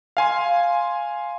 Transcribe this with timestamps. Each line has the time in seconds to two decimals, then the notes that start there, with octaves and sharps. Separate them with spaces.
0.17 F5 G#5 C6